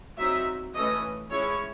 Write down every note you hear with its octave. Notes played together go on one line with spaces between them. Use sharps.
F#3 C4 D#4 E5
E3 A3 C#4 D#5
G#3 C#4 E4 C#5